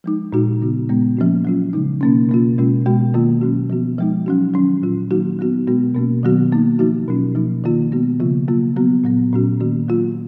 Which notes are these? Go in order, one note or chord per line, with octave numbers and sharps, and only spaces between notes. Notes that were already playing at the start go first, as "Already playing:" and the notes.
F3 G#3 D#4
A#2 G#3 D#4 F#4
C#3 F3 B3 D#4 F#4
A#2 G#3 B3
F3 A#3 C#4 F#4
F#3 C#4 F4
C#3 G#3 D#4
B2 A#3 C#4
B2 A#3 C#4 F4
B2 G#3 C#4 F4
B2 G#3 B3 F#4
D#3 A#3 F4
B2 F#3 C#4 F#4
F3 B3 F#4
F3 G#3 D#4
F#3 C#4 F#4
D#3 F#3 C#4
A#2 F#3 C#4 F4
D#3 F#3 A#3 D#4 F#4
F#3 B3 F#4
B2 G#3 B3 F#4
B2 A#3 C#4 F#4
D#3 F#3 B3 F#4
D#3 A#3 D#4
F3 A#3 D#4 F#4
B2 F#3 C#4 F4
F3 A#3 D#4
D#3 A#3 F4
B2 G#3 B3 F#4
C#3 F3 A#3 F4
F#3 A#3 F4
F#3 B3 F#4
A#2 F#3 B3
A#2 F#3 C#4 F#4
D#3 A#3 C#4 F#4
F#3 A#3 F4